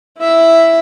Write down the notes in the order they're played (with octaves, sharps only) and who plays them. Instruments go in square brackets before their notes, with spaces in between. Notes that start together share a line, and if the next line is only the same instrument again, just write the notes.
[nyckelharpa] E4 E5